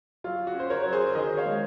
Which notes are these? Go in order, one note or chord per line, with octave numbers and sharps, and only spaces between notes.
F#3 F4
F#4
C#4 C5
A#4 C#5
F#3 C#5
G#4 C5
D#3 C5 D#5
C#5 F5
G#3